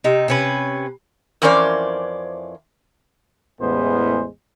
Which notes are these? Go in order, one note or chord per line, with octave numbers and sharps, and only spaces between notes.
C3 D#4
C3 C#4 B4
F2 E3 C#4 A#4 C5 D5
A1 E2 A2 G#3 B3 C5